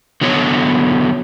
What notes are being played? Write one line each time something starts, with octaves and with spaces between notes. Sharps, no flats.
D3 F#3 B3 C#5